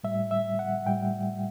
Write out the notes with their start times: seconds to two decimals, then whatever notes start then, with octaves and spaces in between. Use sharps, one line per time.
0.04 A2 G3 E5
0.31 E5
0.59 F#5
0.86 A2 G3 G5